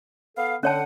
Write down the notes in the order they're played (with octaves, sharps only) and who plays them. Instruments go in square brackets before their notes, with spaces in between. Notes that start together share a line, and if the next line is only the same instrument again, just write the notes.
[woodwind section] B3 A4 F5
[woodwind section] D3 F#5 [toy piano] C#4 C#5 A5